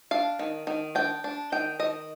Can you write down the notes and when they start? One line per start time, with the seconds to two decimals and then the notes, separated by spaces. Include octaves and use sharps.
0.11 D4 F5
0.39 D#3
0.67 D#3
0.95 D4 G5
1.24 D4
1.52 D#3 G5
1.79 D#3 D#5